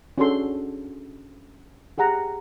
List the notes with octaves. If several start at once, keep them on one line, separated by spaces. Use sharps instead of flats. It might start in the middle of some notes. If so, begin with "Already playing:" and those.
C#4 D4 F#4 G#4 A4 C6
G4 G#4 F#5 A#5